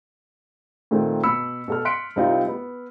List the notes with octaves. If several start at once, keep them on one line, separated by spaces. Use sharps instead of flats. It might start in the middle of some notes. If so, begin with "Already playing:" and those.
A#2 D#3 A3 C4
B2 B5 E6 C#7
B2 A4 F6
C6 F#6 B6 C#7 D7
C2 C4 D#4 F4
B3